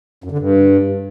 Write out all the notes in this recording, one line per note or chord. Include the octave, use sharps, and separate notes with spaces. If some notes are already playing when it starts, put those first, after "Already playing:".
F#2
D3
G2